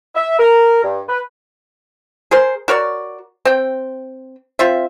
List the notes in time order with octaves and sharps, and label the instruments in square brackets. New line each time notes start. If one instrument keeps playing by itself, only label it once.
[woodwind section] E5
A#4
G2
B4
[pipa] G#4 A#4 C5
F#4 A#4 C#5 D5
C4 G5
C4 F4 E5